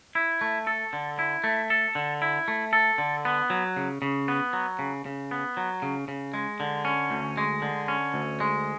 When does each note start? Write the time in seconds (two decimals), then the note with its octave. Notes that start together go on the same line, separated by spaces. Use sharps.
0.15 E4
0.41 A3
0.67 A4
0.93 D3
1.19 E4
1.44 A3
1.70 A4
1.95 D3
2.22 E4
2.48 A3
2.73 A4
2.98 D3
3.25 B3
3.50 F#3
3.76 C#3
4.02 C#3
4.28 B3
4.53 F#3
4.79 C#3
5.06 C#3
5.31 B3
5.57 F#3
5.82 C#3
6.08 C#3
6.34 G#3
6.60 D3
6.85 C#4
7.10 D2
7.37 G#3
7.62 D3
7.88 C#4
8.14 D2
8.40 G#3